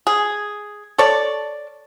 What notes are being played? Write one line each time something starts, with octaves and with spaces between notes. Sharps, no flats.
G#4
A4 C#5 D5